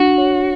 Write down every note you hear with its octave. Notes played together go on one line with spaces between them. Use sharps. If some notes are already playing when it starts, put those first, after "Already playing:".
Already playing: D4 F#4
C#5